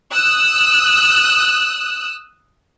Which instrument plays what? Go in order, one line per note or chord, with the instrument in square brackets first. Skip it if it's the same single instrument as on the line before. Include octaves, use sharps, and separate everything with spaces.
[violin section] D#6 E6 F#6